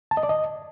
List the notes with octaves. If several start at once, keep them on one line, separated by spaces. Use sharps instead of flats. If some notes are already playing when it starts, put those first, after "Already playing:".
A5
D#5
D5
D#5